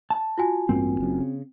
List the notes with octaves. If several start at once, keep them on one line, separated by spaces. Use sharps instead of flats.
A5
F4 F#4 G#5
A1 G2 A#3 C4
F#1 F#2
C#3